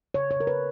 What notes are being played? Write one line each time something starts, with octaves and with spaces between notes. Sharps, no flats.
C#3 C#5
C#5
C#3 A#4
B4